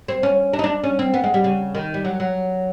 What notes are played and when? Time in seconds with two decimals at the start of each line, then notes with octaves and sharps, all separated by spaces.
0.08 C4
0.23 C#4
0.53 D4
0.59 D#4
0.64 D4
0.84 C#4
0.99 C4
1.14 B3
1.24 G#3
1.34 G3
1.44 C#3
1.75 D#3
1.94 G3
2.05 F#3
2.20 F#3